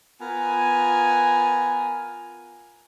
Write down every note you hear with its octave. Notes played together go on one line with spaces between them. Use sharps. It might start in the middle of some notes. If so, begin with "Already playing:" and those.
B3 F4 A#4 G#5